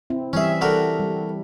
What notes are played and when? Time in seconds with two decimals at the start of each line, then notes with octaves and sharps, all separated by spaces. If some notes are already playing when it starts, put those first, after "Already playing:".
0.10 C4 E4
0.33 E3 G3 C#4 G#4 E5
0.61 D3 F#4 A#4
1.00 G3